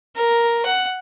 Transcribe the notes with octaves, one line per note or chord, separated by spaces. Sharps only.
A#4
F#5